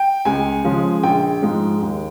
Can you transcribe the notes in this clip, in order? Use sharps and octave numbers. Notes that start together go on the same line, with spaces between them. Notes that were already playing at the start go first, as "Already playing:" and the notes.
Already playing: G5
C#2 G#5
C#3 F3 G#3
A#1 G5
G#2 F3 G#3
D#2